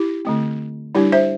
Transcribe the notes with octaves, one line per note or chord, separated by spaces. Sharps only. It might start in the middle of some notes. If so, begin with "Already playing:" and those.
Already playing: E4 G4
D3 A3 C4
G3 D4 E4 G4
C5 E5